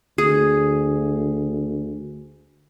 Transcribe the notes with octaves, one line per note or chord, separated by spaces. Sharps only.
D2 G#4